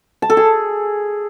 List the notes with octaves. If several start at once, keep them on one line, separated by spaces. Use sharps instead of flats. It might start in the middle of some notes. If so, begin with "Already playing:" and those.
A5
A4
G#4